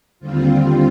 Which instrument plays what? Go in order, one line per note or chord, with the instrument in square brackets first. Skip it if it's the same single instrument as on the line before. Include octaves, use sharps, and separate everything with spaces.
[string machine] D#2 D3 G3 C4 F4